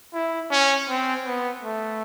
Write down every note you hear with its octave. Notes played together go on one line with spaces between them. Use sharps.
E4
C#4
C4
B3
A3